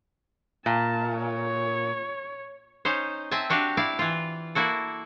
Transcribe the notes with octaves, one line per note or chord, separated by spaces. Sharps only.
A#2 A5
C#5
C#4 D#4 C5
C4 E5 G#5 A5
D4 F#4 G4 F5
E4 D5 F5
E3 F4
A#3 E4 F#4 A4